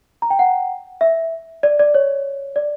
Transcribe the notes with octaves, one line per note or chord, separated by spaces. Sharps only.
A#5
G5
F#5
E5
D5
D5
C#5
D5